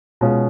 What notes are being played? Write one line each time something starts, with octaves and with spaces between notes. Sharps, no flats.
B2 G#3 C#4 F4